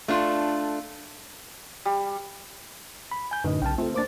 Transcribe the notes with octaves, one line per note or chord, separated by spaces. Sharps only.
A3 D4 F4
G3
B5
G#5 G6
F#2 A2 D3 D#4 B4 D#5
B1 C#3 G5 A5 F6
A3 C4 F4 A4
A#3 D4 C5 D6 A6